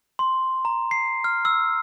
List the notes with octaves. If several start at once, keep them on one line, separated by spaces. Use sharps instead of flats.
C6
A#5
C7
F6
E6